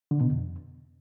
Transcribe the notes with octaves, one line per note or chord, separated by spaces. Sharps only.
D3
B2
F2